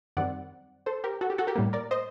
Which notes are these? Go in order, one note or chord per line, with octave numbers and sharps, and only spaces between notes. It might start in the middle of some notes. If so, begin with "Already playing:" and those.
F#2 D#3 G3 C4 D5 F#5
A4 C5
G4 A#4
F#4 A4
G4
F#4 A4
G4 A#4
A2 G3 A#3
A#4 D5
C5 D#5